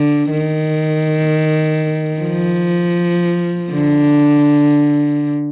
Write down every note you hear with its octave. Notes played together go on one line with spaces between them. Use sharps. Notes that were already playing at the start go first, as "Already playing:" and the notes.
Already playing: D3
D#3
F3
D3